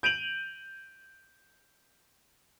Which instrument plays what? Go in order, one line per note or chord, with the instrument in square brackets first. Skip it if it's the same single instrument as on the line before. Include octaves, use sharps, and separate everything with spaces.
[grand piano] G6 D7 D#7 F7 F#7